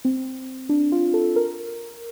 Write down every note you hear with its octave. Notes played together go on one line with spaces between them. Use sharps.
C4
D4
F4
A4
A#4